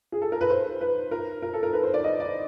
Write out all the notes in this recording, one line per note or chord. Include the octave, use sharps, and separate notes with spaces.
G#4
A4
A#4
B4
C5
B4
A#4
A#4
A4
A#4
B4
C5
D5
D#5
D5